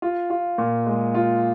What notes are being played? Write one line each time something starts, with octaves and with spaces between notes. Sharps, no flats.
F4
F4
A#2
G#3
F4